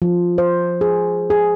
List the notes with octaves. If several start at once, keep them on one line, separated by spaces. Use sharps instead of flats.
F3
C5
G#4
G#4